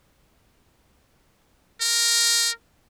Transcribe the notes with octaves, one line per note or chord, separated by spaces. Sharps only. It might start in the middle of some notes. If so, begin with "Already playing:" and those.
A#4